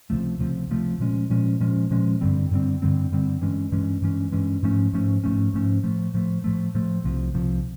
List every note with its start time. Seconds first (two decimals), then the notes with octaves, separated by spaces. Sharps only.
0.10 C#2 C3 F3 A3
0.40 C#2 C3 F3 A3
0.70 C#2 C3 F3 A3
1.00 A#2 F3 G#3 C#4
1.30 A#2 F3 G#3 C#4
1.60 A#2 F3 G#3 C#4
1.91 A#2 F3 G#3 C#4
2.21 G2 D3 G3 C4
2.51 G2 D3 G3 C4
2.82 G2 D3 G3 C4
3.12 G2 D3 G3 C4
3.42 G2 E3 G#3 C#4
3.72 G2 E3 G#3 C#4
4.02 G2 E3 G#3 C#4
4.32 G2 E3 G#3 C#4
4.63 G#2 F3 A3 C#4
4.93 G#2 F3 A3 C#4
5.24 G#2 F3 A3 C#4
5.54 G#2 F3 A3 C#4
5.83 A2 F3 A3
6.14 A2 F3 A3
6.44 A2 F3 A3
6.75 A2 F3 A3
7.04 C2 C3 F3
7.34 C2 C3 F3